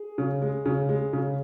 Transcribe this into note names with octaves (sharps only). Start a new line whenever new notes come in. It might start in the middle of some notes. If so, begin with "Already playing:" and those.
Already playing: G#4
C#3
G#3
C#3
G#3
C#3